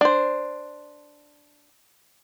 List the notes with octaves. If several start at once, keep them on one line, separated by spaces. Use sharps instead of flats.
D4 C5